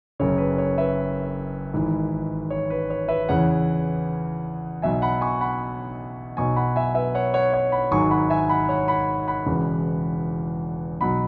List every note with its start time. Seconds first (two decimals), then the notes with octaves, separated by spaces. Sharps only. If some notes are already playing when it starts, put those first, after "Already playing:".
0.20 F#1 F#2 C#3 C#5
0.38 B4
0.58 C#5
0.78 B4 E5
1.74 G#1 G#2 E3
2.50 C#5
2.70 B4
2.90 C#5
3.08 B4 E5
3.29 E2 C#3 E3 C#5 F#5
4.82 B1 B2 F#3 E5 G#5
5.02 F#5 B5
5.21 G#5 C#6
5.41 F#5 B5
6.37 B1 B2 F#3 G#5 C#6
6.56 F#5 B5
6.76 E5 G#5
6.95 B4 E5
7.15 C#5 F#5
7.34 C#5 F#5
7.53 C#5 F#5
7.72 F#5 B5
7.91 G#1 G#2 F#3 G#5 C#6
8.11 F#5 B5
8.30 E5 G#5
8.49 F#5 B5
8.69 C#5 F#5
8.88 F#5 B5
9.28 F#5 B5
9.46 E1 E2 C#3
11.01 B1 B2 F#3 F#5 B5